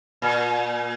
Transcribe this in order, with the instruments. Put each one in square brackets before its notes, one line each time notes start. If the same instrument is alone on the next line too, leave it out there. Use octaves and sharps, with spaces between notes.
[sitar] A#2